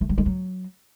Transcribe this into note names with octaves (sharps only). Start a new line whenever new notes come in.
A3
G3
G#3
F#3